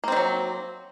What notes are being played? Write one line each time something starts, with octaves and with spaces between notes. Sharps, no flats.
D#3 F#3 A#3 C4